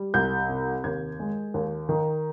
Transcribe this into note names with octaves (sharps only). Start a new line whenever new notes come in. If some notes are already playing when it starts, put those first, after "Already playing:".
Already playing: G3
C2 G6
C3
D#2 G#6
G#3
D#2
D#3